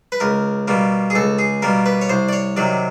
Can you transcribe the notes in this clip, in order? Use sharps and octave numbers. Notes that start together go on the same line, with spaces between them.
B4
C#2 A#4
B2 G3 A#3
G#4
C#2 A4
G#4
B2 G3 A#3 A#4
B4
C#5
C2 C5
D5
C#5
C3 D#3 F#3 D5